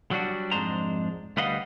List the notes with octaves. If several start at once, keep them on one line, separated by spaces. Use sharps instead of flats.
F#3 G3 D4 F#4
F2 G#2 G#3 D4 C5 A#5
D2 G3 B4 D#5 F5 F#5